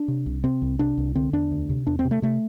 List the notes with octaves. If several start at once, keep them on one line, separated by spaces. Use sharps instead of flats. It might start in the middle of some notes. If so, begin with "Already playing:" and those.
Already playing: D4
C3
C2
C3 C4
C2
C3 D4
C2
D3 C4
E2 D4
D2
C3
E2 D4
C4
C3
A3
C3 A3